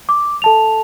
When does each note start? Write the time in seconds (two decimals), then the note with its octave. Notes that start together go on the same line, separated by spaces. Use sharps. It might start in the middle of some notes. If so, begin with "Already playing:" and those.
0.09 D6
0.42 A4 A5 F7